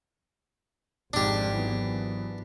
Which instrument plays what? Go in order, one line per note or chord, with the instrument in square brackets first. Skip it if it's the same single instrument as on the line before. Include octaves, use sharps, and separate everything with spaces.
[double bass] G#1 [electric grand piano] F2 G#2 [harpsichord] D4 G4
[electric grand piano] E3 F#3 B3